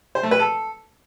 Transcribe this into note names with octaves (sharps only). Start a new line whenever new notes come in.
C5
A3
B4
A4